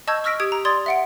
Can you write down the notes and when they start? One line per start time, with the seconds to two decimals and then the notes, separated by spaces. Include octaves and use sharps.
0.08 D#5 A5 C#6 E6 G6 G#6
0.24 C#6 E6 F6 A#6 B6 D7
0.40 G4 D#6 G#6 D7
0.52 A#5
0.65 D5 C6 D#6 G#6 A6
0.86 E5 F#5 D7